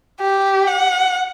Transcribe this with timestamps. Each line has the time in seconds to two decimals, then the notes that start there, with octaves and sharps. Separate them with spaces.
0.20 G4
0.67 F#5